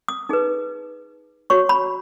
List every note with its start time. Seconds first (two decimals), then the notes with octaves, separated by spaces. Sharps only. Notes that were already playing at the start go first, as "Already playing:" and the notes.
0.08 D#6
0.29 D#4 G#4 B4
1.50 F#4 C#5 C#6
1.69 B5